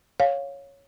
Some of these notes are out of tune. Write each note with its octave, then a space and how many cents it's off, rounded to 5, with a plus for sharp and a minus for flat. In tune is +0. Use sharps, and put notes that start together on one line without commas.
C#5 +0 F5 +10